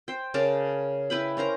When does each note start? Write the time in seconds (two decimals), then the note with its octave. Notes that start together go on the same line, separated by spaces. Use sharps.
0.08 C5 G5
0.34 C#3 A#4 A5 D6
1.10 E4 B4 G5 B5
1.37 C#4 A#4 C5 A#5